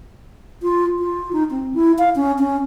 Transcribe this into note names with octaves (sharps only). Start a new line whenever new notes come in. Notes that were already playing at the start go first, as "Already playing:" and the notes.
F4
F4
D#4
C4
E4
F5
C#4
C#4